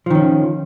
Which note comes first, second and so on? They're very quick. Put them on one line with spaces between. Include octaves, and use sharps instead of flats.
F3 D#3 C#4